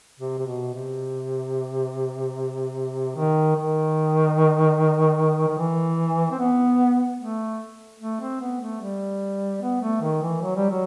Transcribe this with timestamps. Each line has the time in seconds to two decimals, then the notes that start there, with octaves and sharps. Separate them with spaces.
0.20 C3
0.38 C3
0.46 B2
0.74 C3
3.16 D#3
3.56 D#3
5.47 D#3
5.58 E3
6.31 C4
6.39 B3
7.19 A3
8.00 A3
8.20 C4
8.40 B3
8.60 A3
8.81 G3
9.62 B3
9.82 A3
10.02 D#3
10.22 E3
10.42 F#3
10.56 G3
10.70 F#3